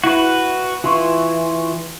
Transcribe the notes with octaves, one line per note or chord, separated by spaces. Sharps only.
E4 F#4 B4
E3 F4 C6 C#6